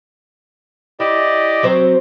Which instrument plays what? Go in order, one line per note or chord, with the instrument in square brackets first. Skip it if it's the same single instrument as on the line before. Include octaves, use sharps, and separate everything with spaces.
[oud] E4 [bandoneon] G4 D5 D#5
[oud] F#3 C4 C5